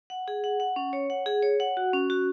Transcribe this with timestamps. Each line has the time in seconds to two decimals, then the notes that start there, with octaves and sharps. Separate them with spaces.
0.10 F#5
0.28 G#4
0.44 F#5
0.60 F#5
0.76 C#4
0.93 C#5
1.10 F#5
1.26 G#4
1.43 C#5
1.60 F#5
1.77 F#4
1.93 C#4
2.10 F#4